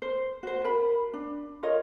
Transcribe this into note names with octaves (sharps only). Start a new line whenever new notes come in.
C5
F#4 C5
A#4 B5
D4
F4 A#4 C#5 D#5